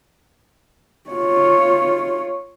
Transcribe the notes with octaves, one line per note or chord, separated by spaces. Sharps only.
F4 C#5